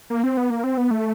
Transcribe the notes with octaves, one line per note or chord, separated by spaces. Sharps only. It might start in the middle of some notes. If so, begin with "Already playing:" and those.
A#3
C4
B3
A#3
C4
B3
A3